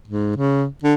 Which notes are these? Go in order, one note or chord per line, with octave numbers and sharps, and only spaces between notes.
G#2
C#3
D3